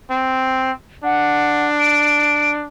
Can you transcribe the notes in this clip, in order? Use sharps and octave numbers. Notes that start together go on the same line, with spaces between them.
C4
D4 F#5
D7